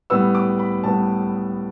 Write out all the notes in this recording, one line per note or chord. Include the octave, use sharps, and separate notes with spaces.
A2 G3 B3 E6
D6
B5
A2 G3 B3 A5